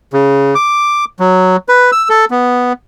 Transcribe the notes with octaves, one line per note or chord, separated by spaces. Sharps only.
C#3
D6
F#3
B4
E6
A4
B3